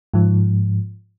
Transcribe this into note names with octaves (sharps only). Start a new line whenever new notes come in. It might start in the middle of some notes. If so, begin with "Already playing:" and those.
G#2 F3